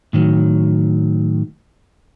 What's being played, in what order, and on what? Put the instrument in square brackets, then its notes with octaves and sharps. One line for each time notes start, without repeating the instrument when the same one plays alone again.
[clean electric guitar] A2 D#3 F#3